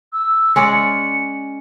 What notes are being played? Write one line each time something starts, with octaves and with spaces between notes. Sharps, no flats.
E6
G#3 C#4 D5 C#7